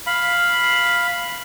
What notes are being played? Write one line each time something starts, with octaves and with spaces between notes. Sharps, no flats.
F5 B5